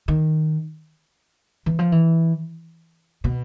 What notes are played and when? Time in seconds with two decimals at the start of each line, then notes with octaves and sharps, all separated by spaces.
0.08 D#3
1.66 E3
1.79 F3
1.92 E3
3.24 B2